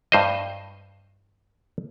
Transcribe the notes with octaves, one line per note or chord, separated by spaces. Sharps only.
G2 C5 D#5